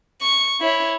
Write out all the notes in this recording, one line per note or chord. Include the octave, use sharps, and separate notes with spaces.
C#6
E4 C#5